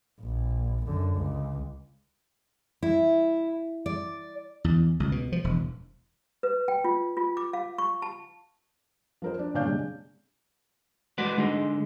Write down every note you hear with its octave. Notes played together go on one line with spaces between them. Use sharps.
A#1
F#2 D3
C#2
E4
D5
E2
C#2
B2
F3
E1
B4
G5
F4
F4
D6
F5
C#6
A5
F3 A#4 C5
D4
A#2 D3 C#4 D4 F5 G6
C3 G#3
G#3 F#4 B4 D5 F#5
D3 G#3 D#4